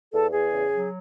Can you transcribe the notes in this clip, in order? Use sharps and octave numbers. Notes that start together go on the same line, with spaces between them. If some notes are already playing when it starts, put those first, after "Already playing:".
E2 A4
E2 G#4
C#3
F#3